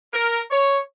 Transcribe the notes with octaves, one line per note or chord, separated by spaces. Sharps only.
A#4
C#5